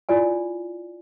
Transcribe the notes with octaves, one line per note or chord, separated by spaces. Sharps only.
E4 F4 D5 G#5